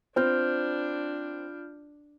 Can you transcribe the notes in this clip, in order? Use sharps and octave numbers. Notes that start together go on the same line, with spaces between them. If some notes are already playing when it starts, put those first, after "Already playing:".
C4 D4 F4 F6 G6